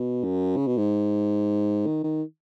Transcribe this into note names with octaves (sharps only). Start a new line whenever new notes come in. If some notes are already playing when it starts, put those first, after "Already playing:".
Already playing: B2
F#2
C#3
B2
G#2
D#3
D#3